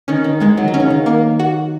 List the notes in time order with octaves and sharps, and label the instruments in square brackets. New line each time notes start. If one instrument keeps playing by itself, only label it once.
[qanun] D#3 [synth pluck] C#4
[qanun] D#3
[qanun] D#3 [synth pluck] G#3
[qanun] F#3
D#3
[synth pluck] C#4
[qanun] C#3
D#3
[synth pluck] A#3
F#4